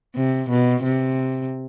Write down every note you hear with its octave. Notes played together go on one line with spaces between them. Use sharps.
C3
B2
C3